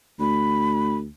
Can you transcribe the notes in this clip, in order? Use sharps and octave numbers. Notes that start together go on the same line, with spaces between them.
D2 B5